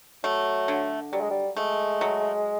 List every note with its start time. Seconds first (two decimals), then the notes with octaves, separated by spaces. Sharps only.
0.24 F#3 A3
0.68 D3
1.13 F#3 G3
1.21 G#3
1.30 G3
1.57 G#3 A3
2.01 F#3